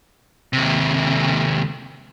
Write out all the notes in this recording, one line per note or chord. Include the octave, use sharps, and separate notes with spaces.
D#2 C3